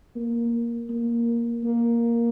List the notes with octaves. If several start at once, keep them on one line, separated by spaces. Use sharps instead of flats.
A#3
A#3
A#3